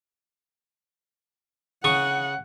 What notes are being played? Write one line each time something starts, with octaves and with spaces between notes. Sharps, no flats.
C#3 F#5 C#6 D#6